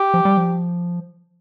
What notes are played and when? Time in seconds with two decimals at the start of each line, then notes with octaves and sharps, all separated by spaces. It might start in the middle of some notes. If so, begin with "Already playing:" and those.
Already playing: G4
0.14 F3
0.25 G3
0.37 F3